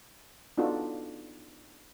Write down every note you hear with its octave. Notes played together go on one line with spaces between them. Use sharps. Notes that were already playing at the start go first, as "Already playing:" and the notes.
B3 D4 D#4 F4 F#4 A4